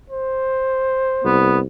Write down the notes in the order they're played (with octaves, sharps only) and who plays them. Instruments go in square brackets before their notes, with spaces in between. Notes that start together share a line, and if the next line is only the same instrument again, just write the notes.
[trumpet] C5
[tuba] C2 [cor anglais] B3